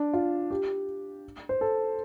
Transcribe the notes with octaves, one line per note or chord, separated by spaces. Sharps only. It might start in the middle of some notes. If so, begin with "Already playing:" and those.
Already playing: D4
F4
G4
C5
A4